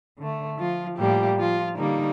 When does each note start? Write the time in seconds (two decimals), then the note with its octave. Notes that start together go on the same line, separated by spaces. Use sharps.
0.18 D3 A3
0.58 F3 F4
0.98 A2 F3 G3 A#3 G4
1.38 F3 F4
1.78 D3 G3 A#3 D#4